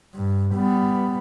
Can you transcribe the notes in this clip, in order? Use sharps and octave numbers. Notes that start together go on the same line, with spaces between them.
G2
G3 B3